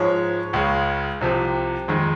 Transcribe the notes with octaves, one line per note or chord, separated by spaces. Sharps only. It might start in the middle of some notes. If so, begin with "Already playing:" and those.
Already playing: G#2 F3 G#3 C#5
C#2 C#3 G#3
C2 C3 F3
F2 D#3 G#3